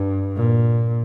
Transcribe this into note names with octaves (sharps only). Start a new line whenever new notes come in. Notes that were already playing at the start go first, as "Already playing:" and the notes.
Already playing: G2
A#2